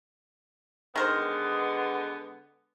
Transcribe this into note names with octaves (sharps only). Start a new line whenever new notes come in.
D3 D#3 G#3 B3 A#4 C5